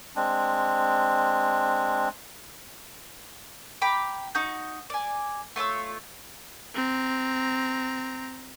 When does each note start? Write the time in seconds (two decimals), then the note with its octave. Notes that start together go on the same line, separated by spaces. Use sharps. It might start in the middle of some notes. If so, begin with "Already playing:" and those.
0.16 G#3 C4 D4
3.82 G5 A#5 B5 D6
4.35 D#4 F#4 G6
4.90 D5 G#5
5.56 A3 F4 C#5 E6
6.74 C4 A#5